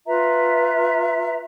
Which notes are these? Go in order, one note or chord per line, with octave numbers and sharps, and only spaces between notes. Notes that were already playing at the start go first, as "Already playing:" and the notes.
F4 B4 E5 A#5